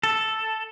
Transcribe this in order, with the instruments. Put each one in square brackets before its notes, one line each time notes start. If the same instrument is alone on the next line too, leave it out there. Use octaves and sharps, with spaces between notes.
[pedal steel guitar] A4